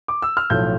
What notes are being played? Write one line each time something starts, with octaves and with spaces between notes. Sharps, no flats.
D6
E6
F6
B1 A2 F3 A3 G6